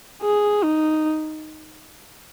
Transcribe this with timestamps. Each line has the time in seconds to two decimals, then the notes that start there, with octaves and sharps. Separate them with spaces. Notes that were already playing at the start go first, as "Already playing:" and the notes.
0.22 G#4
0.64 D#4